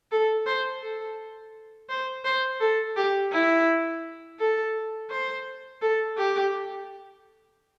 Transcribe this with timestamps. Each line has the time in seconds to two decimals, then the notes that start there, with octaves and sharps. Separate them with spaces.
0.11 A4
0.46 C5
0.82 A4
1.89 C5
2.24 C5
2.60 A4
2.96 G4
3.32 E4
4.39 A4
5.10 C5
5.82 A4
6.18 G4